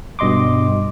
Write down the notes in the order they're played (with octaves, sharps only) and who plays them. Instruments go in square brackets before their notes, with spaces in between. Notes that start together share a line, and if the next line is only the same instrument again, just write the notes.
[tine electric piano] G2 B2 D#5 C6 D6